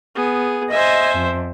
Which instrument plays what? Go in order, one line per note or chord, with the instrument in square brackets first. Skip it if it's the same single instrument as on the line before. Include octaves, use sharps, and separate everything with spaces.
[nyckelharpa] B3 G#4
[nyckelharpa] C5 E5 [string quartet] D#5 G#5
[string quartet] F2